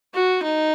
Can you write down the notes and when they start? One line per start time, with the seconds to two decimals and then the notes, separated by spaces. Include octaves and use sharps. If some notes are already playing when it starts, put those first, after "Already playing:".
0.14 F#4
0.43 D#4